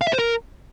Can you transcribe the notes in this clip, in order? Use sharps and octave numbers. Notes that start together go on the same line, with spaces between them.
F5
E5
C5
A#4